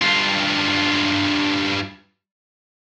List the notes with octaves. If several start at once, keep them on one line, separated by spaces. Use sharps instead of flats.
G2 F4